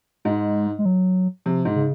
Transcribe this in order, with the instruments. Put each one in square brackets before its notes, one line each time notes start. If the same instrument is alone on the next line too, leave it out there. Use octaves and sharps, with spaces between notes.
[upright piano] G#2 [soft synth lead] G#3
[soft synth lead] G#3
F#3
[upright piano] C3 [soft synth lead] F3
[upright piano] G#2
[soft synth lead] C#3